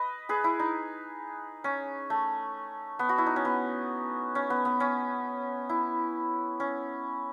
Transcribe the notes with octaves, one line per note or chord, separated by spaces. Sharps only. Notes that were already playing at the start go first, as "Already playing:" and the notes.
Already playing: B4 D#5
G#4 B4
E4
D#4
C#4
A3
B3
F#4
E4
D#4
C#4
B3
C#4
B3
B3
C#4
E4
C#4